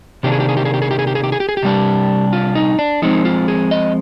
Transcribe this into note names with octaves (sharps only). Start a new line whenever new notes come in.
C3 D#3 A#3 D4 G4
G#4
G4
G#4
G4
G#4
G4
G#4
G4
G#4
G4
G#4
G4
G#4
G4
G#4
G4
C3 G3 D4
F4
D#4
D4
F3 G#3 C4 D#4
F4
G#4
D#5